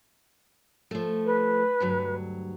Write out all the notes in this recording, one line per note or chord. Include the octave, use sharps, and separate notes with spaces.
F3 A3
B4
D2 G2 F#3